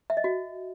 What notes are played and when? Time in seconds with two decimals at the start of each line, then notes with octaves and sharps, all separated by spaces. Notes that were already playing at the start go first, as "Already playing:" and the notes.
0.10 E5
0.17 D#5
0.24 F#4